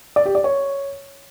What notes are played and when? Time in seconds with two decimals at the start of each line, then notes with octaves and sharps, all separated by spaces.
0.16 D5
0.25 G4
0.35 D5
0.44 C#5